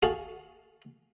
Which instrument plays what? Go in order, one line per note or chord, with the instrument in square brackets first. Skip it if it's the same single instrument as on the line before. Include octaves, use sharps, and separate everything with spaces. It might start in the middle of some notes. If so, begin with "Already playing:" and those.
[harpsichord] F#4 G#4 A4 F5